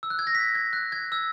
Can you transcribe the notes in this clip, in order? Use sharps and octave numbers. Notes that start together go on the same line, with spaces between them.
E6
F#6
G#6
A#6
B6
G#6
F#6
G#6
E6